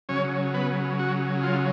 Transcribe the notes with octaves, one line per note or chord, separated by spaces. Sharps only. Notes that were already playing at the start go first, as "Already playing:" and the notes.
C#3 F#3 C#4 C#5
B3 B4
F#4
F4